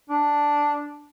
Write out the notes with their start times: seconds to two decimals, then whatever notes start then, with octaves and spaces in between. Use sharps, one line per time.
0.09 D4